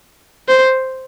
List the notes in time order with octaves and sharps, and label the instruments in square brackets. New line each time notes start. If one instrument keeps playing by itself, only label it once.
[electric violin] C5